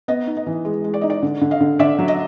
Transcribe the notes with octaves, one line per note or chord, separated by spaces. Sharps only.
B3 D#5
D#4
D#5
E3
G#3
G#3
D5
D#4 D#5
D5
D3
D3
D#5 F5
D3
D3 D5 E5
F#3
D#5